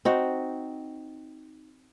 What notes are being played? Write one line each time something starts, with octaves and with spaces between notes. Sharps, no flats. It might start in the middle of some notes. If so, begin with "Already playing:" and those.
C4 D#4 F#4